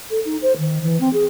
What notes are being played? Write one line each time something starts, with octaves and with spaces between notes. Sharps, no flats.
A4
D#4
C5
D#3
E3
C4
G#4